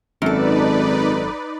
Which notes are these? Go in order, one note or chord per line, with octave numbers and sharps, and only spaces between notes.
G#1 F#2 D#4 A4 B4 D5